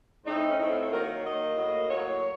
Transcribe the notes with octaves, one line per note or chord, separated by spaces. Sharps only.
A2 A3 C4 D#4
C#4
A2 A3 C4 D#4
F4
C#5
C5
D#3 F#3 A#3 A#4
C#5
C#5
D#3 F#3 A#3 D#5
A2 F#3 A#3
A2 F#3 A#3 C#5